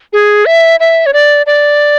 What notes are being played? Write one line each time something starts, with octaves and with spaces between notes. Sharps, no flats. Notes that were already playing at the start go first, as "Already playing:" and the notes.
G#4
E5
E5
C#5
D5
D5